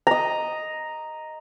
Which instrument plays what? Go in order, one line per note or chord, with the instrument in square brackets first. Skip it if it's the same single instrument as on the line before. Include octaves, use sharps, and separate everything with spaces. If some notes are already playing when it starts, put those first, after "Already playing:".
[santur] D#5 A#5